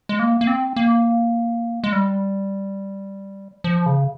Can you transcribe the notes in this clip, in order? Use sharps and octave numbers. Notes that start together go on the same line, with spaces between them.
G#3
A#3
A#3
C4
A#3
G#3
G3
F3
C#3